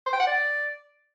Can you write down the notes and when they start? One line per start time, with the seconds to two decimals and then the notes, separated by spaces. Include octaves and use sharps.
0.06 C5
0.13 G5
0.20 F#5
0.27 D5